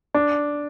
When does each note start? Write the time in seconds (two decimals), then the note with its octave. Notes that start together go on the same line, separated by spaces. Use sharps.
0.14 D4